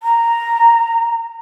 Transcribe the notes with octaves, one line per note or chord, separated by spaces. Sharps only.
A#5